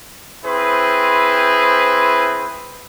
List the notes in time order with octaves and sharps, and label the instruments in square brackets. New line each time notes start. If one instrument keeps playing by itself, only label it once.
[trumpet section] C4 E4 G#4 B4 C5